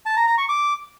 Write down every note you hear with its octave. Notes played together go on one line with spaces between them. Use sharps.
A5
A#5
A#5
C#6
D6